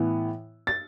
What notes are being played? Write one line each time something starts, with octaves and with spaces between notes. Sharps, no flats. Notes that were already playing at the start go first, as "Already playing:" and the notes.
Already playing: A2 E3 B3 E4
A6